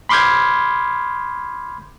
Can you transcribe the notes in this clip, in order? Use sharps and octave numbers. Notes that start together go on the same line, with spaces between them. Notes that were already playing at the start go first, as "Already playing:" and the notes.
B5 C6 D6 F6 G6 G#6